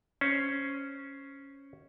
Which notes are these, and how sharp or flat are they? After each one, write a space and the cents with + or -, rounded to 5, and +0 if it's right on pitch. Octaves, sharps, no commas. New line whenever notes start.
C#4 +0 C5 +0